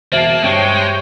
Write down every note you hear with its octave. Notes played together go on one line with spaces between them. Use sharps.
E1 B2 A#3 C5 E5 A5 C7 F#7
G2 G#3 C#5 G5